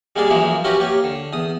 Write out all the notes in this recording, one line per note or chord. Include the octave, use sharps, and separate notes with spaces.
G3 G#3 A#3 G#4 D5
F#2 E3 F3 G#3 A#3
C#4 E4 F#4 G4 A#4 B4
A#3 G4 C#5
D3
E2 D#6